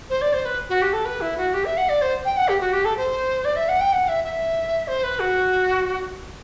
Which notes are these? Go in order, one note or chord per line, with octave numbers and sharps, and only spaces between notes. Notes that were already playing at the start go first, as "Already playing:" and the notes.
C5
D5
C5
B4
F#4
G4
A4
B4
E4
F#4
G4
E5
F#5
D5
C5
G5
F#5
G4
F#4
G4
A4
C5
D5
E5
F#5
G5
F#5
E5
E5
C5
B4
F#4